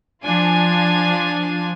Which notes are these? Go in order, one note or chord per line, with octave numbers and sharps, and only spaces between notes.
F3 D4 F4 G#5